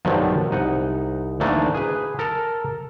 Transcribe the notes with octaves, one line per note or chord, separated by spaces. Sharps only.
B1 G2 D3 D#3 F3 F#3
C2 D#4 F#5
D2 E3 A3 A#3 D4 D#4
G#4 B4
A4 A#4 A#5